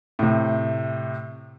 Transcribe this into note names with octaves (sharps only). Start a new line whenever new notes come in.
A2 C3